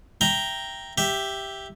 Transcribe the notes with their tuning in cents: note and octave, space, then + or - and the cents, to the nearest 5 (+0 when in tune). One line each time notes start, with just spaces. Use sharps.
E5 +15 G5 +0 A#5 +0
G4 +0 E5 +0